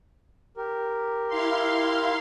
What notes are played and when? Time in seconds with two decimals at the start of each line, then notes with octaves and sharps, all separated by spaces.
0.57 G4 A#4
1.28 E4 F5 C6